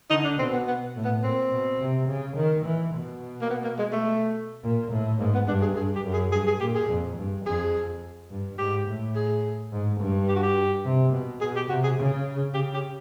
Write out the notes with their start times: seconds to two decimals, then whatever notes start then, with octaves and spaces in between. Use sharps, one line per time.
0.10 D3 D#4
0.25 D4
0.39 B2 C4
0.53 B3
0.67 B3
0.95 A2
1.05 B3
1.24 A#2 C4
1.52 B2
1.80 C3
2.08 C#3
2.37 D#3
2.65 E3
2.94 B2
3.42 A#3
3.50 B3
3.64 A#3
3.79 G#3
3.92 A3
4.63 A#2
4.91 A2
5.19 G#2 A#3
5.34 B3
5.48 G2 D4
5.62 G#4
5.76 G2 G#4
5.96 G4
6.04 F#2
6.13 G#4
6.32 G2 G#4
6.47 G#4
6.60 A#2 G4
6.75 G#4
6.90 F2
7.17 G2
7.46 F2 G#4
8.31 G2
8.59 G#2 G4
8.88 A2
9.16 G#4
9.72 G#2
10.00 G2
10.29 G4
10.36 F#4
10.43 G4
10.85 C3
11.13 B2
11.41 B2 G#4
11.56 G4
11.69 C3 F#4
11.84 G#4
11.98 C#3
12.54 C#3 G4
12.74 G4